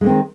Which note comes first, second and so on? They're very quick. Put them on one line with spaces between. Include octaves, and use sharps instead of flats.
G#3 D3 C4 D#3